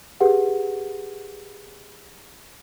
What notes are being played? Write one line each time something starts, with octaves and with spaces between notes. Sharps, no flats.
G4 G#4 B4 F#5